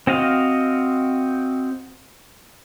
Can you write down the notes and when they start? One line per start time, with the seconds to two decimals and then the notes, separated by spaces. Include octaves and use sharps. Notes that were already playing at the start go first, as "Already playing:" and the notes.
0.07 C4 F#4 D#5 F5